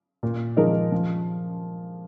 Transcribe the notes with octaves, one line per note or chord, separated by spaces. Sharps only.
A#2
F3 G#3 D#4 A#4
F3